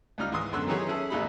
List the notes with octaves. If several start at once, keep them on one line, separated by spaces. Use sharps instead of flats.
C#2 G3 D#4 F6
G#2 E3 C6 D#6
B1 F#2 D3 C6 E6 F#6
E3 F#3 D#4 G4 G#4 C#5
C#4 E4 G#4 A4
A1 D#2 G#3 D#4 E4 B5